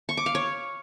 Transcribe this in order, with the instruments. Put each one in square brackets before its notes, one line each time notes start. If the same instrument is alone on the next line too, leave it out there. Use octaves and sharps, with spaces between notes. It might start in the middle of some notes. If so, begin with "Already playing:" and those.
[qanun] C#6
D6
F5
C#5